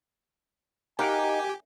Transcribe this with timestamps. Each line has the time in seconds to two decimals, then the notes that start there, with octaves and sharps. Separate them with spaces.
0.99 D#4 G4 A#4 F5 F#5 G#5